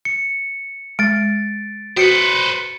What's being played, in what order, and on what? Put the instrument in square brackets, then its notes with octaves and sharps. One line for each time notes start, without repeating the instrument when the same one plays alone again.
[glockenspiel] C#7
[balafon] G#3 [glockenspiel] A6 D7
[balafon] F#4 [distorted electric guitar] B4 C5 [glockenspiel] C#7 D7